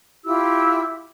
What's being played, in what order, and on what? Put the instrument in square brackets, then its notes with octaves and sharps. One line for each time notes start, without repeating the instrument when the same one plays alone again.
[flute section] E4 F4 G4 E6